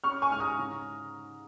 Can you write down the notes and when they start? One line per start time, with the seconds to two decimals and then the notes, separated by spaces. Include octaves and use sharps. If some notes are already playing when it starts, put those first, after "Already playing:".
0.04 C#4 C#6 F6
0.22 G#5 C#6
0.31 G#2 F6
0.40 A#5 D#6
0.59 C#3